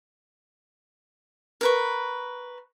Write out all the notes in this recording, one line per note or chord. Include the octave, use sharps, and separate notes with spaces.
A#4 B4 C#6